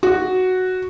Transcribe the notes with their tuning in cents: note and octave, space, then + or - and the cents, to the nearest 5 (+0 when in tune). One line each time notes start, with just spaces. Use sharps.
F#4 +0